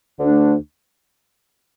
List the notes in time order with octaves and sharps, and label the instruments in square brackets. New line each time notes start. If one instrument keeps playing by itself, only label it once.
[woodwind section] D2 D3 A3 D4